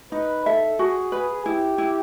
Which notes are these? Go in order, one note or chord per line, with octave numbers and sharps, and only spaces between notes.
D#4 B4
A4 E5
F#4 G#4
B4
E4 G4
E4